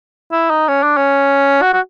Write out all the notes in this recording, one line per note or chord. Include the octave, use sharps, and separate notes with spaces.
E4
D#4
C#4
D4
C#4
F#4
F#4